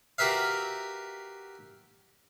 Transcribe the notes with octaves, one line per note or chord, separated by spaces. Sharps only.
F#4 G4 A#4 B4 E5 F5